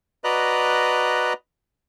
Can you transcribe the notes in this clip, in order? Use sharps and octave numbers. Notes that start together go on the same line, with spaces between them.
F#4 B4 D5 D#5 A#5 F#6